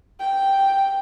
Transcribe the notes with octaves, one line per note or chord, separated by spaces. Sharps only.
G5